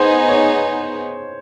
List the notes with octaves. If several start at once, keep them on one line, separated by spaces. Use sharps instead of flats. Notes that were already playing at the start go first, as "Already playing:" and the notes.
Already playing: B3 D#4 G#4 C5
C#5